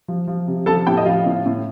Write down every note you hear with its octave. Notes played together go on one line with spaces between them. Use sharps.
F3
F3
C3
F3 A4 A5
A2 G4 G5
D#5
F3 F4 F5
A2
A2